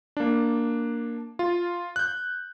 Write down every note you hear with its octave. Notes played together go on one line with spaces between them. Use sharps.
A#3 D4
F4
F#6 G6